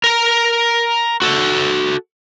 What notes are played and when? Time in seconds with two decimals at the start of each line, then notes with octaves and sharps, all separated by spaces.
0.04 A#4 A#5
1.22 F#4 A4